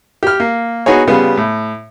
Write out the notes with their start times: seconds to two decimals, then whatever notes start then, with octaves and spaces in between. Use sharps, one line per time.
0.23 G4 F6
0.40 A#3
0.86 B3 D#4 F#4 G#4 C#5
1.07 C#3 G3 B3 F4
1.37 A2